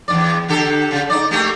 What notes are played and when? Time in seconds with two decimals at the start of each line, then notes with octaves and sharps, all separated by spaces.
0.08 E2 G#2 D5
0.48 D3 G4 A4
0.91 C#3
1.10 D#4 D5
1.31 A3 A#3 G4